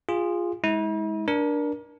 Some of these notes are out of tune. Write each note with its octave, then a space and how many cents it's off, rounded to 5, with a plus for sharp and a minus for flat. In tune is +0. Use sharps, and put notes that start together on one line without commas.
F4 +0 G#4 -20
G#3 +0 E4 -45
D4 +0 A#4 +25